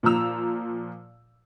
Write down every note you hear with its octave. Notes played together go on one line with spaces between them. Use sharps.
A#2 F3 A#5 E6 F7